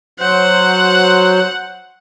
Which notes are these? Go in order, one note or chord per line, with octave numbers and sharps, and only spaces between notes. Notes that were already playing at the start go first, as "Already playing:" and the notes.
F#3 C5 F#5